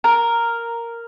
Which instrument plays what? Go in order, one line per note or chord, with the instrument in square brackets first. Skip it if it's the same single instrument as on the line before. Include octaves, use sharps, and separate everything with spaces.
[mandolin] A#4